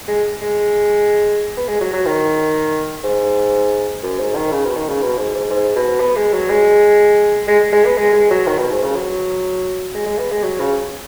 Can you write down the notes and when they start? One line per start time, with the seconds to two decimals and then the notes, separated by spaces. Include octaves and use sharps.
0.08 G#3
0.41 G#3
1.57 B3
1.68 G#3
1.81 F#3
1.93 F#3
2.06 D#3
3.04 G#2
4.03 F#2
4.19 G#2
4.36 D#3
4.52 C#3
4.65 B2
4.77 D#3
4.89 C#3
5.02 B2
5.18 G#2
5.35 G#2
5.50 G#2
5.76 B2
6.00 B3
6.16 G#3
6.33 F#3
6.50 G#3
7.47 G#3
7.72 G#3
7.85 B3
7.97 G#3
8.13 G#3
8.31 F#3
8.47 D#3
8.59 B2
8.71 G#2
8.84 C#3
8.96 F#3
9.95 G#3
10.06 G#3
10.19 B3
10.32 G#3
10.43 F#3
10.60 C#3